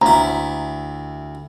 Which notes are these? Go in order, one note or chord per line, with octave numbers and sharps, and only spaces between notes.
D2 E4 A#5